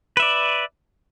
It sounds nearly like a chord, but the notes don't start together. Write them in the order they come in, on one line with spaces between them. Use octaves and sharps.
B4 E5 D5